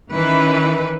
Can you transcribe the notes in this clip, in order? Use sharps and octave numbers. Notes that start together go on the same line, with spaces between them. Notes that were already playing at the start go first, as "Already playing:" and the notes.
D#3 E3 C#4 B4